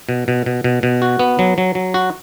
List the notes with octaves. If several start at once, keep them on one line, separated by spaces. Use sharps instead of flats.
B2
B2
B2
B2
B2
F#4
B3
F#3
F#3
F#3
F#4